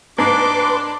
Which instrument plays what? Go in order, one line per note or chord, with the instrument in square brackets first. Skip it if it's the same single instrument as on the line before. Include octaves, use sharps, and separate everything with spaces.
[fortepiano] G#2 [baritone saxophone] D4 [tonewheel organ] B4 C6 [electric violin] D6